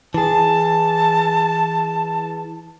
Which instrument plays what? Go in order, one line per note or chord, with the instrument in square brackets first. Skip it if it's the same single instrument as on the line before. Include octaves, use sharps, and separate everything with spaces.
[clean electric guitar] E3 G#4 [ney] A5